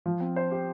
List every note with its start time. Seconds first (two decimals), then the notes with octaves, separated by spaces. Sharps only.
0.06 F3
0.20 C4
0.36 C5
0.52 G4